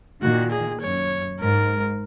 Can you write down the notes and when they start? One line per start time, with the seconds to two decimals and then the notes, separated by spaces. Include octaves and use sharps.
0.21 A#2 D#3 F#4
0.51 G#4
0.81 F#2 C#5
1.40 G#2 A#4